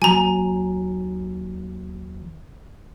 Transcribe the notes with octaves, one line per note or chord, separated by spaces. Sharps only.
D#2 F#3 G#5 A#5